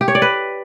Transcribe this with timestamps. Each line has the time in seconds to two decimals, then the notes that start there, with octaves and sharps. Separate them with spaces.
0.01 G4
0.08 C#5
0.15 D5
0.22 B4